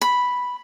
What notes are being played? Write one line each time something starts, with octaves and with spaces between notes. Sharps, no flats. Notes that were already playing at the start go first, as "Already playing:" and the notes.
B5